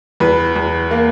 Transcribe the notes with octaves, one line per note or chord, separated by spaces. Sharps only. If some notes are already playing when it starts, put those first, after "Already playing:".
E2 B4
E2
A#3